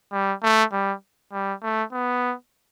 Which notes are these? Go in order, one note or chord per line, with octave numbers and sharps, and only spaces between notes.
G3
A3
G3
G3
A3
B3